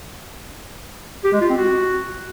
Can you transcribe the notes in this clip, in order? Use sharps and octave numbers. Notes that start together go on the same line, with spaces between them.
G4
G#3
F4
C4
F#4